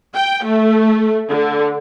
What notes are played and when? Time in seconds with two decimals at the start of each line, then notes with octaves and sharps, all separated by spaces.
0.16 G5
0.46 A3
1.29 D3